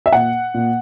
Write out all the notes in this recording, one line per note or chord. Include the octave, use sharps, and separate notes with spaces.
E5
A#2 F#5
A#2